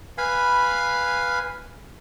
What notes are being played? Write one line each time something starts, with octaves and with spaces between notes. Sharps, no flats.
B4 F5 G#5 B5